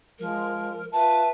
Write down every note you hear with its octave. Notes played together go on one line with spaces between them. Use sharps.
F3 G#3 A#4
F4 B4 E5 A5